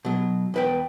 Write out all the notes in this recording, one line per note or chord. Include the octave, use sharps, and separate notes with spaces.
B2 F#3
E2 B4 G5